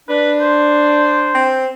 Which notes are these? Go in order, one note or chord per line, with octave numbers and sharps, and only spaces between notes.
D4 B4
C5
C4